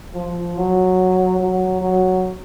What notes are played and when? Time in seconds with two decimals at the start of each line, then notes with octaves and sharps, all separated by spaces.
0.15 F3
0.57 F#3
1.40 F#3
1.81 F#3